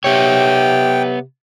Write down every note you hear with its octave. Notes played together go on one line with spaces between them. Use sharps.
C3 B3 C#5 G5